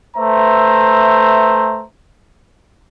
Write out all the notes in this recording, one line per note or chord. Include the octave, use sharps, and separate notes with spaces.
A3 B4 C5 E5 A#5